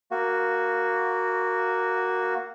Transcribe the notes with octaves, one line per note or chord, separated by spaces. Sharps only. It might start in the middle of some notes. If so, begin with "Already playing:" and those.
A#3 F#4